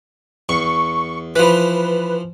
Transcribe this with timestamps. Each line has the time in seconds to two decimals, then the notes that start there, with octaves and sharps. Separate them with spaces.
0.49 E2 C#6
1.36 E3 F3 B4